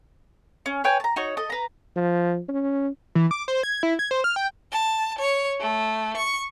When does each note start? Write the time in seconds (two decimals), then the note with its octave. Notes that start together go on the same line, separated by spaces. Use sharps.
0.66 C#4
0.84 B4 C#5 G5 G#5
1.00 A5 A#5
1.16 D#4 F#4 C#5
1.37 A4 D#5
1.50 B4 A#5
1.96 F3
2.49 C#4
3.15 E3
3.31 D6
3.48 C5
3.63 G#6
3.83 E4
3.99 G#6
4.11 C5
4.24 F6
4.36 G5
4.72 A5
5.19 C#5
5.61 A3
6.17 C#6